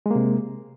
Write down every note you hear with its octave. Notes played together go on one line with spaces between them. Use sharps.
C3 G#3 A#3